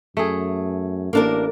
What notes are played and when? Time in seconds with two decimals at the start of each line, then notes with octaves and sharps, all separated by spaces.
0.17 F#2 A3 G#4
1.13 A1 A#3 D4 A#4